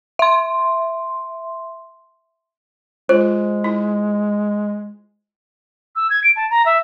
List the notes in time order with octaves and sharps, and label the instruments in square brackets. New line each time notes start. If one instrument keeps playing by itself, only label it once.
[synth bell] E5 C6
[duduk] G#3 [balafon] F4 [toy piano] C5
[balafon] E4
[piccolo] E6
G#6
D7
A5
A#5
E5